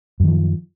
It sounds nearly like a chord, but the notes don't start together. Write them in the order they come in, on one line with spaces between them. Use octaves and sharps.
F#2 D#3 F3